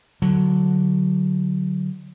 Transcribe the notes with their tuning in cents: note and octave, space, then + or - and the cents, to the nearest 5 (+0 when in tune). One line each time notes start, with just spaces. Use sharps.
D3 +0 F#3 +0